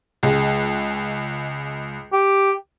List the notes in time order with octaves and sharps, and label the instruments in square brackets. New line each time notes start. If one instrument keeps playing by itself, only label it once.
[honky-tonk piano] C#2 G#3
[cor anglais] G4